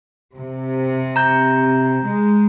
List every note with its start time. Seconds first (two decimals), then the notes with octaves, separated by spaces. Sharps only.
0.35 C3
1.16 A#5 G6
2.03 G#3